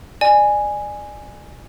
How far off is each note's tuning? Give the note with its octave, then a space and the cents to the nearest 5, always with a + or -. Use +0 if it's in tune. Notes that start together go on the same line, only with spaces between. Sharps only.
D5 +30 G#5 +0